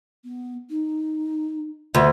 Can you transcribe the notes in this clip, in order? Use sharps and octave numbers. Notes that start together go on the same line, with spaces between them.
B3
D#4
D2 E5